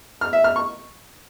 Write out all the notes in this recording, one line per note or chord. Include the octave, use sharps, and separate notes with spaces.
F6
E5
F6
C#6